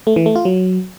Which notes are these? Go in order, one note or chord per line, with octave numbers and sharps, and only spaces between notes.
A3
E3
A3
F4
F#3